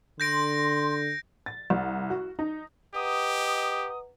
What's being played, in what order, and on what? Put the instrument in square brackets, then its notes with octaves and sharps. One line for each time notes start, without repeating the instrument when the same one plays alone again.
[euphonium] D3 [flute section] C6 [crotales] G6 A#6 D7
[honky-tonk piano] A6
C2
F#4
D#4
[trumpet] G4 [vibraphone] B4 F#5 A#5 [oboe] D#5 [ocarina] D#6